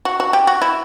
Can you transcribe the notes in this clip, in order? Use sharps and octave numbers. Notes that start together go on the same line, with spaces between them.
F#4
F#4
G4
F#4
E4